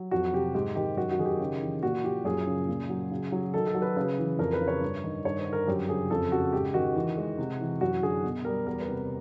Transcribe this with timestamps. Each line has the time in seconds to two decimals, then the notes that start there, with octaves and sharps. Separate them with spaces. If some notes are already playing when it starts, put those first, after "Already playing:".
Already playing: F#3
0.11 F2 F#4
0.33 C3 G4
0.54 G#2 G4
0.75 D#3 G4
0.97 F#2 F#4
1.11 F#4
1.19 D#3 G#4
1.25 G4
1.40 C#3
1.61 E3
1.83 A#2 F#4
2.04 F3 G4
2.25 F#2 G#4
2.47 C#3
2.69 A#2
2.90 F#3
3.11 C#3
3.32 F#3
3.54 D#3 A4
3.68 A4
3.75 F#3
3.82 B4
3.96 C#3 B4
4.18 E3
4.39 F2 A#4
4.53 B4
4.61 C#3
4.68 C#5
4.81 G2
5.04 D#3
5.25 G2 C#5
5.39 C5
5.46 D3
5.53 A#4
5.67 F#2 G4
5.89 C#3 G#4
6.10 F2 A4
6.32 C#3 F#4
6.53 G#2 G4
6.74 D#3 F#4
6.95 E3
7.17 G#3
7.38 C3
7.60 E3
7.81 F#2 F#4
8.03 D3 G#4
8.24 B2
8.45 G3 A#4
8.66 E2 A#4
8.81 B4
8.88 C3